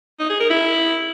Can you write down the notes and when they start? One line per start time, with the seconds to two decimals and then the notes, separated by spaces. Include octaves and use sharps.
0.20 D#4
0.30 G#4
0.40 A#4
0.50 E4